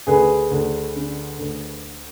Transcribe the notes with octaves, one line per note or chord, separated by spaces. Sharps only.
D2 G#4 B4
D2
D3
D2